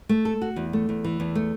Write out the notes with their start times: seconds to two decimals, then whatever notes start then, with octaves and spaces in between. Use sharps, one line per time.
0.09 A3
0.25 A4
0.42 F#4
0.56 E2
0.73 A3
0.89 E2
1.04 E3
1.20 E2
1.35 A3